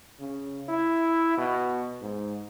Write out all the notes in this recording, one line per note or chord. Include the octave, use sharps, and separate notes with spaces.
C#3
E4
B2
G#2